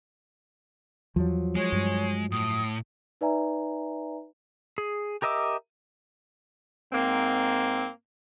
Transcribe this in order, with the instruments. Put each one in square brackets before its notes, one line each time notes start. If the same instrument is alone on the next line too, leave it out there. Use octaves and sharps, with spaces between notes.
[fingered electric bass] E2 [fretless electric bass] F3 F#3
[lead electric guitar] G#3 [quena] C#5
[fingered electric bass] G2
[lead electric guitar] A2 [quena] D#6
[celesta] D#4 B4 D5 E5 G#5 A#5
[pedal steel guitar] G#4
G4 A#4 D#5 E5 D6
[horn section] G#2 A#3 C4